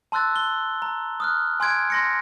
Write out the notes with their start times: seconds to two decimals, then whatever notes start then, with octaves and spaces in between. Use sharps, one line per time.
0.12 A5 C6 E6 F#6 A6
0.36 G7
0.82 A#5
1.20 D#6 F6 F#6
1.60 G#5 C6 F#6 G#6 D7
1.90 C6 A#6 C#7